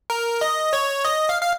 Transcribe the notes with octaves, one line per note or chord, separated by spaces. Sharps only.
A#4
D#5
C#5
D#5
F5
F5